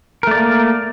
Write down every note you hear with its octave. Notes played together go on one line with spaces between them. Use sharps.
A3 A#3 A#4 D5